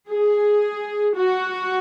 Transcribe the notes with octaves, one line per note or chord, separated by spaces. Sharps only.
G#4
F#4